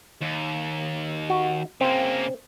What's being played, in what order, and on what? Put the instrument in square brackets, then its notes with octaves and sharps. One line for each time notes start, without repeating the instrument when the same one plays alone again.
[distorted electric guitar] D#2
[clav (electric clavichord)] F#4
[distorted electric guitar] C#3 A#3 [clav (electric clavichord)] C4